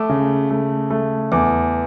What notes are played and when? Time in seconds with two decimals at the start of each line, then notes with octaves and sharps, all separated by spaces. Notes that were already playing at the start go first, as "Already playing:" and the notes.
Already playing: A3 D6 E6
0.09 C#3
0.50 A3
0.90 A3
1.32 E2 D6